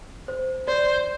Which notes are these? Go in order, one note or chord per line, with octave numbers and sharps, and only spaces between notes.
C5
C5 D5